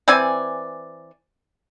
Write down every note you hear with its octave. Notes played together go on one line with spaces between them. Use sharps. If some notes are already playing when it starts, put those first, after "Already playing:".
E3 C4 D5 G#5